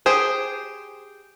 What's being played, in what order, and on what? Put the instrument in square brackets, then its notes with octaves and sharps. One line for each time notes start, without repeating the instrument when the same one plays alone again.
[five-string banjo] G4 G#4 C5